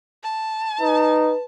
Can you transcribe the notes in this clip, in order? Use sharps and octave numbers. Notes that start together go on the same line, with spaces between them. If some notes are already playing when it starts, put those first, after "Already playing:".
A5
D#4 B4